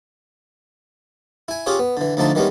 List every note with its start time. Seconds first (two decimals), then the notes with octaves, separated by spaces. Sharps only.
1.48 E4 G#5
1.66 C#4 F4 G4 G#4 C#5
1.79 B3
1.97 D3 E3
2.17 D2 D3 F3 A3 D#4 A5
2.35 D#3 E3 G3 G#3 B3 C#4